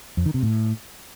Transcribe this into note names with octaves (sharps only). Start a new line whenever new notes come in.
F2
D#3
C3
A2